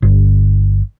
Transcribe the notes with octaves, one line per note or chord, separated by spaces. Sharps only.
G1